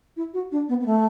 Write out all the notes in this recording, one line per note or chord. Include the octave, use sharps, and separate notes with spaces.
E4
F#4
D4
B3
B3
A3